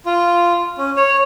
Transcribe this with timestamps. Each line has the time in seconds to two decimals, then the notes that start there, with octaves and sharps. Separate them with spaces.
0.06 F4
0.78 C#4
0.97 C#5